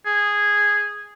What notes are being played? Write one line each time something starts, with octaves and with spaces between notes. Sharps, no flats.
G#4